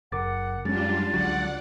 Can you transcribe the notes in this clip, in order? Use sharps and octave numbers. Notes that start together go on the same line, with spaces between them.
F#1 A#4 F#5 D6 A6
F#2 G3 G#3 C#4 D4 F4 A6
C#2 D3 F#3 D5 F#5